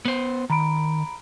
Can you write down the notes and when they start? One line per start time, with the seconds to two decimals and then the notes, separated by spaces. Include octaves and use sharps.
0.05 B3 C5
0.50 D#3 A#5 B5 D7